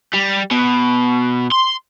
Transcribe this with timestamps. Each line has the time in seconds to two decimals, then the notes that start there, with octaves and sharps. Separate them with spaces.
0.13 G3
0.51 B2
1.52 C6